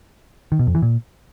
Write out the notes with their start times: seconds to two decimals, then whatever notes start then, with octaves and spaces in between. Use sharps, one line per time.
0.52 D#3
0.59 B2
0.67 F2
0.75 E3
0.82 A#2